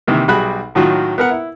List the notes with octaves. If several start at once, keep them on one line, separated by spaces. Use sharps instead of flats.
C3 D#3 E3 A#3
B1 G3 F#4 G#4 B5 F#6
A2 D#3 F#3 F4 F#4
B3 A#4 F#5
E4